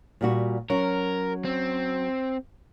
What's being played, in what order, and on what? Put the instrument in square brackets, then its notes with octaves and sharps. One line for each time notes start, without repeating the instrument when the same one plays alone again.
[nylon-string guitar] A#2 G3 F#4
[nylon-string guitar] F#3 C#4 F#4 [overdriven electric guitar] A#4
[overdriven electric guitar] C4